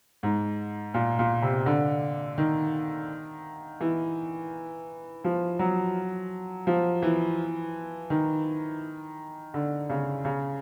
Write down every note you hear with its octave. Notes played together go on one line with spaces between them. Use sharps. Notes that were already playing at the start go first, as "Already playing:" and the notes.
G#2
A#2
A#2
C3
D3
D#3
E3
F3
F#3
F3
E3
D#3
D3
C#3
C#3